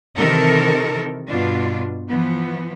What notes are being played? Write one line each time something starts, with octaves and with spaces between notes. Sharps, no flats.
C3 D#3 E3 A4 A#4
G2 B2 D4 F4
E3 F3 B3